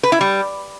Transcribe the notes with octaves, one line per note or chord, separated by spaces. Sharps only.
B4
E4
G3